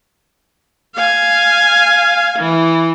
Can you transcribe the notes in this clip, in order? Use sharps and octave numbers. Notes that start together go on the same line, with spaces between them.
F5 G#5
E3